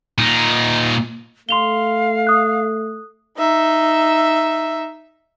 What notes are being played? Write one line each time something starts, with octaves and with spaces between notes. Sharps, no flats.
A#2 D#4
A3 F5 C6 F7 G7
D#6 F#6
D#4 E5